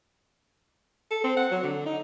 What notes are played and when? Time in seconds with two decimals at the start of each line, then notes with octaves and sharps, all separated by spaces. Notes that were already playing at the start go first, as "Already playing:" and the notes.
1.11 A4
1.24 C4
1.37 F#5
1.51 F#3
1.63 D3
1.86 D#4